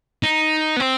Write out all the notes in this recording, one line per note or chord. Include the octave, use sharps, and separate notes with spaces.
D#4
B3
C4